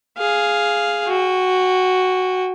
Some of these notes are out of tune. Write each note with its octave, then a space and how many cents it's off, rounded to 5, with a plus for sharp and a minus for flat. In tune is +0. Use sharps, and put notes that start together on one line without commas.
G#4 +0 F5 +0
F#4 +0 G5 +40